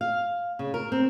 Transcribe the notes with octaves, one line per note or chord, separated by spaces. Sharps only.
F5
C#3
A#4
C4